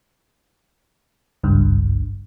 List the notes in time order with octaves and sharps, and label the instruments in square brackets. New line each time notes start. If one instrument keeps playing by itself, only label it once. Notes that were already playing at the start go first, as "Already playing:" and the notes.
[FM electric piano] G#1 C#2 G2